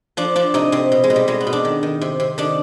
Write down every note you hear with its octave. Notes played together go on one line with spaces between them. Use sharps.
F3 D4
F3 D4
C3 D#4
C3 C4
B2
G#3
B2
G3
B2 G#3
B3
B2
D4
D#3
D#3
C3
C3
D#3 D4